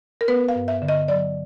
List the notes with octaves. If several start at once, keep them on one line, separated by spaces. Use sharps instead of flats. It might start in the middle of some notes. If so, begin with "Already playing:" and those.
A#4
B3 B4
F5
G2
E5
D3
D#5
F#3 D5